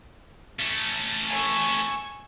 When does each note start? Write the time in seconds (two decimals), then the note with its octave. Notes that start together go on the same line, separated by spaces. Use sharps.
0.59 A3 C#4
1.29 G#5 C#6 E6